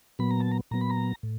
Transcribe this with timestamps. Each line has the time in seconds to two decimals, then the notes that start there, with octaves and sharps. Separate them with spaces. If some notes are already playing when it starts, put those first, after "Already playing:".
0.19 A#2 F#3 B3 B5
0.31 A#5
0.40 A5
0.52 A#5
0.71 A#2 F#3 B3 A#5
0.81 B5
0.90 A#5
1.23 A2